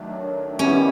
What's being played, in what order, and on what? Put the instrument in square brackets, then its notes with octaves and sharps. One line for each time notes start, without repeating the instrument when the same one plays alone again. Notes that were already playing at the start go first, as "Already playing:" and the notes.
Already playing: [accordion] D#3 F#3 A3 D4
[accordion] D#3 G3 B3 E4 G4 [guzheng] C#4